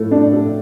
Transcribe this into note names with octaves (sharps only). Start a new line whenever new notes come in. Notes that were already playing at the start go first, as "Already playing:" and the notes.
Already playing: A2 A3 A4
D4
A4